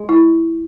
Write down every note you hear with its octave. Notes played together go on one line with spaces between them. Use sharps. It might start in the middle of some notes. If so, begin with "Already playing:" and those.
Already playing: G#3
E4